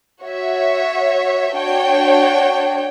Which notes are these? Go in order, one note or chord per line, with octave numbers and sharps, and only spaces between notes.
F#4 C#5 E5
D4 F#4 C#5 G5